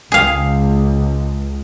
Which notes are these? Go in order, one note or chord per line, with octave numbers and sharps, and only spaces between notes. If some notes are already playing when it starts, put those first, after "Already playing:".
C#2 G#4 F5